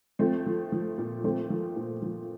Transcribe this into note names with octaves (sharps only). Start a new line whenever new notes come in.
F3 A3 C4
F3
F3
A#2
F3 A3 C4
F3
A#2
F3